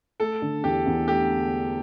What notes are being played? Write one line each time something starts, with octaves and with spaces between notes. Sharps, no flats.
A3 A4
D3
E2 G4
E2
A3 G4